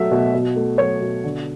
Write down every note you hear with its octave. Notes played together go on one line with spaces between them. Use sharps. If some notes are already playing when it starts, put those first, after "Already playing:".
Already playing: B2 F#3 A3 E5
B2
B2
A3
F#3 C#5
B2
D3